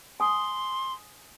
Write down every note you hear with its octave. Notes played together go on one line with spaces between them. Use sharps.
G#5 C6 D#6